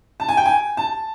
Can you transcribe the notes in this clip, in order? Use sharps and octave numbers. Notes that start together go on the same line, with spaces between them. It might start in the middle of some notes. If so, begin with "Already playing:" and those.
A5
G#5
G5
G#5
A5